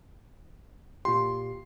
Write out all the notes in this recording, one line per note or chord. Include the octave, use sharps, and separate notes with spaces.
A#2 F4 G4 C6